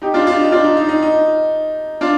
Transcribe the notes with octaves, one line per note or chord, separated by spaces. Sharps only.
D#4 G4
D4 F4
D4 F4
D#4
D4 F4
D#4
D#4
D#4
D#4
D4 F4